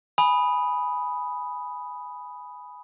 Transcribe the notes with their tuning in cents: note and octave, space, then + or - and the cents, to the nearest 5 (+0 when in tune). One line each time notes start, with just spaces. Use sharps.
G#5 +5 B5 +0 D#6 +0